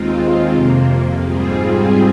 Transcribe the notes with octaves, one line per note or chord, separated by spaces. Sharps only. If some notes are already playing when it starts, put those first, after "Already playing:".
Already playing: D#2 D#3 G#3 C4 F4
F2 C3 F3 A#3
G#2 G3 C4 F4 G#4